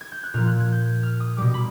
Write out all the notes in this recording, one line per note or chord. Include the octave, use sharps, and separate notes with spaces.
G#6
G6
F#6
A#2 F3 F6
F#6
G#6
G6
F6
D#6
B2 G3 D6
B5